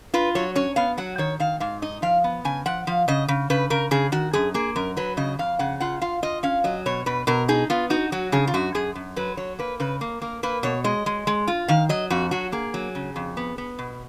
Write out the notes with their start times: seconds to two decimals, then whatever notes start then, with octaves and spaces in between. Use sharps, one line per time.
0.14 F4 B4
0.35 F#3 C#5
0.55 C#4 C#5
0.76 B3 F5
0.98 F#3 F#5
1.18 D#3 C#5
1.40 D#3 F5
1.60 G#2 F5
1.82 D#4 D#5
2.02 F3 F5
2.24 B3
2.45 C#3 G#5
2.66 F3 F#5
2.87 F3 F5
3.08 C#3 D#5
3.28 C#3
3.50 C#3 B4
3.70 C#3 A#4
3.91 C#3 G#4
4.12 D#3 F#4
4.33 F#2 G#4
4.54 A#3 G#4
4.76 F#2 A#4
4.97 F#3 B4
5.17 C#3 D#5
5.39 F2 F5
5.59 C#3 F#5
5.80 F4 F#5
6.01 F4 F5
6.22 F4 D#5
6.43 C#4 F5
6.64 F#3 D#5
6.86 B2 C#5
7.06 B2 B4
7.27 B2 A#4
7.48 D#4 G#4
7.70 B3 F4
7.90 D#4 F#4
8.12 F#3 F#4
8.32 C#3 G#4
8.47 F4
8.54 F#2 F#4
8.75 F#2 G#4
8.95 F#2
9.16 F#3 B4
9.37 F#3 C#5
9.59 A#3 B4
9.80 C#3 B4
10.01 A#3
10.22 A#3 A#4
10.43 A#3 B4
10.63 B2 C#5
10.84 G#3 D#5
11.06 G#3
11.27 G#3
11.48 F4
11.68 D#3 F5
11.89 F#3 D#5
12.10 F2 F#4
12.31 F#3 F#4
12.52 A#3 G#4
12.74 F#3
12.95 C#3
13.16 F2
13.37 B3
13.58 B3
13.79 B2